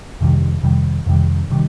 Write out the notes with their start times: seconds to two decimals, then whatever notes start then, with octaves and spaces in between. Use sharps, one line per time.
0.21 F2 C3 D#3 G3
0.63 F2 C3 D#3 G3
1.06 F2 C3 D#3 G3
1.50 C3 D#3 G3